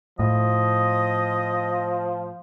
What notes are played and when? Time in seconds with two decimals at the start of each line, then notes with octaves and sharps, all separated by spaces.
0.19 A2 F3 D#5